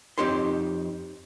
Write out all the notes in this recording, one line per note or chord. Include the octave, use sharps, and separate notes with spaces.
F2 C4 D#4 G4 C#5 C6